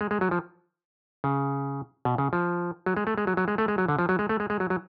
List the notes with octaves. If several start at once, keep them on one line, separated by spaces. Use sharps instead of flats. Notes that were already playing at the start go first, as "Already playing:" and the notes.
G#3
G#3
F#3
F3
C#3
B2
C#3
F3
F#3
G#3
A3
G#3
F#3
F#3
G#3
A3
G#3
F#3
D3
F3
F#3
G#3
A3
G#3
G#3
F#3
F#3